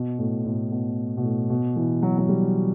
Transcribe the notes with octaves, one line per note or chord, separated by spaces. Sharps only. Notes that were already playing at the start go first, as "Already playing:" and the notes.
Already playing: B2
A2
A2
B2
B2
A2
B2
E3
F#3
F#3
G3